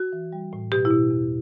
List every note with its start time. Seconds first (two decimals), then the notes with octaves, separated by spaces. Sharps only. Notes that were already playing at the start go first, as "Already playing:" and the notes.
Already playing: F#4
0.13 E3
0.33 G3
0.53 A2
0.72 B2 G4
0.85 E4
0.91 B2
1.10 E2